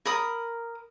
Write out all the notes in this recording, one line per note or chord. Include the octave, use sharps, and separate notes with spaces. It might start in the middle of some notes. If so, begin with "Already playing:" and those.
A#4 B5 D#6